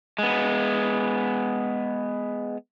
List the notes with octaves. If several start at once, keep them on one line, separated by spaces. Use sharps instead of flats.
G#3 B3